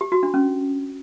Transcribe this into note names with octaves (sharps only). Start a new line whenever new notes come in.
G4
F#4
D4
C#4